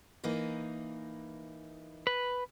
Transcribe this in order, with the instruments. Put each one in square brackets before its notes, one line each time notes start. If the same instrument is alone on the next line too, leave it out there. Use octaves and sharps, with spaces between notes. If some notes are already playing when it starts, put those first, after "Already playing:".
[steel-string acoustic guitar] E3 A#3 D#4
[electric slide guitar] B4